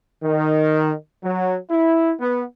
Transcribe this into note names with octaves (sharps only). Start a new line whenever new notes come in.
D#3
F#3
E4
B3